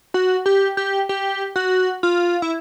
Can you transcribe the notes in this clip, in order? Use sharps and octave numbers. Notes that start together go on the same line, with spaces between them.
F#4
G4
G4
G4
F#4
F4
E4